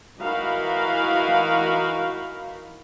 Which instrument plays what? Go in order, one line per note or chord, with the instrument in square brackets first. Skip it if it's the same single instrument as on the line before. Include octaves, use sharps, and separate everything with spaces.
[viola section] E3 D#4 F#4 A#4 F5 B5